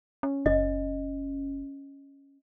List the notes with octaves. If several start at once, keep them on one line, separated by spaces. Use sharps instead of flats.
C#4
F#1 C#4 D#5